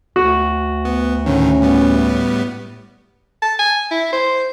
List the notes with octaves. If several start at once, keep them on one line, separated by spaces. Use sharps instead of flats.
D2 F#4
B3
A2 D3 D#3 C#4
A2 G3 B3
A5
G#5
E4
C5